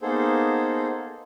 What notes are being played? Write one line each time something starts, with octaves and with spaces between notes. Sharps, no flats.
A#3 B3 D#4 G#4 A4 C5